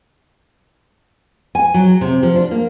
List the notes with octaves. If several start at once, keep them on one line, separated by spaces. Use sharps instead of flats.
G#5
F#3
C3
F3
D4
A#3